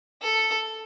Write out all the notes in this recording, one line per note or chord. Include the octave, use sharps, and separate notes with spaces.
A4